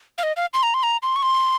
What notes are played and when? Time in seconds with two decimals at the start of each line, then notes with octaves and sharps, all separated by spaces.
0.18 F5
0.23 D#5
0.37 F5
0.54 C6
0.63 A#5
0.74 C6
0.83 A#5
1.03 C6
1.16 C#6
1.23 C6